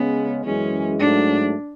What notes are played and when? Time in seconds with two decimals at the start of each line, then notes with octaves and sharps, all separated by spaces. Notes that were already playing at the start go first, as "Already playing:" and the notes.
Already playing: C#3 G#3 B3 C#4
0.44 F#2 E3 G#3 C#4
1.00 G#2 F#3 A3 D4